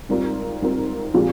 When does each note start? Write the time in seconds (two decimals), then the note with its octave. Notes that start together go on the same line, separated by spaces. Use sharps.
0.09 G#2 G3 C4 F4 A#4
0.62 G#2 G3 C4 F4 A#4
1.14 A#2 F3 G#3 C4 G4